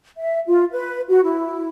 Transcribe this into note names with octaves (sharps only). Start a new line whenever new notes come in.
E5
F4
B4
F#4
E4